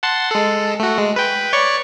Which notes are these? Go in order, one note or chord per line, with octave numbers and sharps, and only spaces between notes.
F#5 A5 C6
G#3 A4
A3 F#4
G#3
B4 G5
C#5 D5 C#6